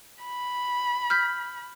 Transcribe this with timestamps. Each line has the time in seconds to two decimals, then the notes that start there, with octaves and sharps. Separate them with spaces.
0.23 B5
1.10 F6 G6 B6